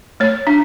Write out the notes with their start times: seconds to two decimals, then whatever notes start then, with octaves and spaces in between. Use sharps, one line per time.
0.20 A3 C#5
0.47 D4